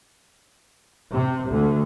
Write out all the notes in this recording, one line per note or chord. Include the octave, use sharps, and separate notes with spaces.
C3
D2